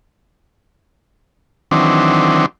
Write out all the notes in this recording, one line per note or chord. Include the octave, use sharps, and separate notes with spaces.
D#3 E3 F#3 C4 D4